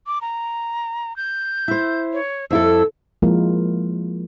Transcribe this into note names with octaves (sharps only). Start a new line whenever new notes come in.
D6
A#5
G6
E4 C5
C#5
F2 E4 A4 E6
F3 G#3 A#3 E4 F4 A#4